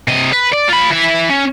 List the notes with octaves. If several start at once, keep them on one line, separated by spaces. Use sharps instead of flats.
C3 D#5
B4
D5
F4 B5
E3 E5
C#4